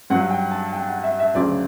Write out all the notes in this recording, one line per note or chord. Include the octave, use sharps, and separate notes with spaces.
G2 F#3 F#5
G5
A5
G5
F#5
E5
E5
D2 C#3 F#3 D5